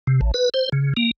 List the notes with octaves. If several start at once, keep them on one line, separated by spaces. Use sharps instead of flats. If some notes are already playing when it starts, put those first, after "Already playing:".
C3
A1
B4
C5
C#3
A#3